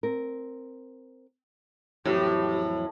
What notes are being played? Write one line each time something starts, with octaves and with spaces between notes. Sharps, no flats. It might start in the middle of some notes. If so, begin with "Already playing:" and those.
C4 A#4
F2 A2 E3 F#3 G4